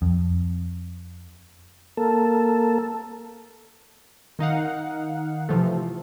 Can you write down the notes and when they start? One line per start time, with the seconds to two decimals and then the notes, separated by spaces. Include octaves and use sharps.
0.02 F2
1.97 A#3 A4
4.39 D#3 D#4 F5 F#5
5.49 C3 E3 F3 A3